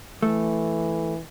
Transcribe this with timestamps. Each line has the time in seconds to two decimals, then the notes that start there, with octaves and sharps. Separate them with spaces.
0.23 E3 A3